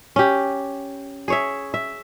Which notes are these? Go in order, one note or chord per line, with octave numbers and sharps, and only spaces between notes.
C#4 G4
G#4 C#5 E5
E5